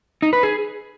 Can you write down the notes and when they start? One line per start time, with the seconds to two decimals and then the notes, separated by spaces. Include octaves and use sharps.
0.22 D#4
0.33 B4
0.43 G#4